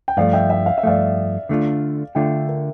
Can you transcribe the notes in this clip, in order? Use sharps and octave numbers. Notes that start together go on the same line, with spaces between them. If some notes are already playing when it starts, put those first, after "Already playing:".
G5
G2 F3 A3 D5 F5
E5 G5
E5 G5
F5
E5
G2 F3 A3 D5 F5
D3 A3 D4 F4
D3 A3 D4 F4 E5 G5
A#4